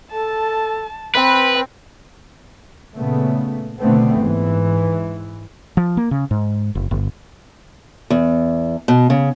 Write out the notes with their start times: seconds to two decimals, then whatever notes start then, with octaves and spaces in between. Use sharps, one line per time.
0.12 A4 A5
1.15 C4 B4 B5
2.96 A#2 C#3 A3 B3
3.80 F#1 B2 D3 A3 B3 C4
4.17 G#2 E3
5.77 F3
5.97 A#3
6.11 C#3
6.31 G#2
6.75 F#1
6.91 G1
8.10 E2
8.88 B2
9.10 C#3